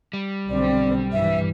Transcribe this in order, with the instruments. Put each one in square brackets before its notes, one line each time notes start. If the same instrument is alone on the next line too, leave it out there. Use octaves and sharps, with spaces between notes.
[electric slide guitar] G3
[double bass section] B1 D3 C4 [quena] D5
[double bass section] G2 E3 [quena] E5